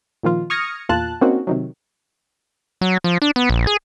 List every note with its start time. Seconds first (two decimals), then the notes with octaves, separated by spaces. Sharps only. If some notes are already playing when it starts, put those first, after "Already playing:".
0.23 A#2 D#3 F3 F4
0.50 C#6 D#6 F6 G#6 A#6 C#7
0.89 E2 A#2 F4 A5 F#6
1.21 A#3 C4 C#4 D#4 F#4
1.47 C3 D#3 F#3
2.81 F#3
3.04 F3
3.22 D4
3.36 B3
3.50 A#1
3.67 G#4